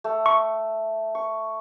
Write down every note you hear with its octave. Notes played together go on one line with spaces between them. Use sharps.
A3
C#6
C#6